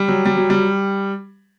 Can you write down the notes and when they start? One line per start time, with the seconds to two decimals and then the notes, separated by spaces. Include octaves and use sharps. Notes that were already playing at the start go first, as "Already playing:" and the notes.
Already playing: G3
0.08 F#3
0.25 G3
0.37 F#3
0.50 G3